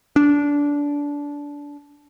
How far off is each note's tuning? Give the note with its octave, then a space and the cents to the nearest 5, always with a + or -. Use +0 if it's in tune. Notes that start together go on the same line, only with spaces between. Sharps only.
D4 -20